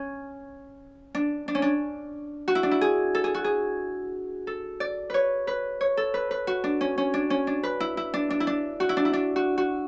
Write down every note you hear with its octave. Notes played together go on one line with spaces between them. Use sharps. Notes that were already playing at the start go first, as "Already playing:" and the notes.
Already playing: C#4
D4
D4
C#4
D4
F#4
E4
D4
E4
G#4
A4
G#4
F#4
G#4
A4
D5
B4 C#5
B4
C#5
A4
B4
B4
F#4
D4
C#4
C#4
D4
C#4
D4
B4
E4
E4
D4
D4
E4
D4
F#4
E4
D4
E4
D4
F#4
F#4